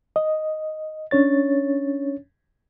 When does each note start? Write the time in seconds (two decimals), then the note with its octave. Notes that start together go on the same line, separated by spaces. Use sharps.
0.16 D#5
1.11 C#4 D4 C#5 A6